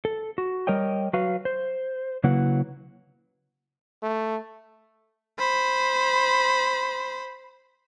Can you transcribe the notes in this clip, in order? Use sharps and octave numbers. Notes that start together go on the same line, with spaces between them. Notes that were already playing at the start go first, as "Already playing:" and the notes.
A4
F#4
G3 A#4 C#5 D#5 G5
F#3 F#4 B4 F5
C5
C#3 F#3 A#3 E4 B4 F#5
A3
C5 B5